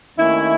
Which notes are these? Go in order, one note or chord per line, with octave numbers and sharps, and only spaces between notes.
D#2 D#3 A3 C#4 E4